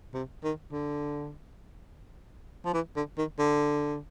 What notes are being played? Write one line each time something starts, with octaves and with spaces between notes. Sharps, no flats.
C3
D#3
D3
F3
E3
D3
D#3
D3